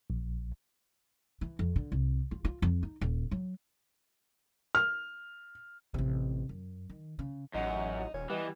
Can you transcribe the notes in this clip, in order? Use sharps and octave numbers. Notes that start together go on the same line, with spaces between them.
A#1
E3
F2
D3
C2
F4
F4
F2
D#4
D#1
F#3
F6
A1 C3
F#2
D#3
C#3
A1 F#2 D#4 F#5
D#1 C#4
E3 G3 B3 D#5